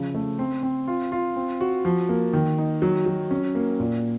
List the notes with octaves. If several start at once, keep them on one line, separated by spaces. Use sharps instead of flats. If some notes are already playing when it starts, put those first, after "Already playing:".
Already playing: C#3 F3
A3
C4
C4
F4
F4
C4
F#4
F3
A#3
D#3
D#4
F#3
F#3
C#4
A#3
A#2